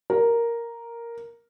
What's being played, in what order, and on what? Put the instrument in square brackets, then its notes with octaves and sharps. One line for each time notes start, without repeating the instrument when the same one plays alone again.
[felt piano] A#4